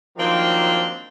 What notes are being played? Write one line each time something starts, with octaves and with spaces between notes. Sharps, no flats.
D#3 F3 F#3 A#3 C4 D4